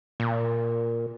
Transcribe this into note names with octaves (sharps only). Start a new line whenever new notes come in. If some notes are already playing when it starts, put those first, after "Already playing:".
A#2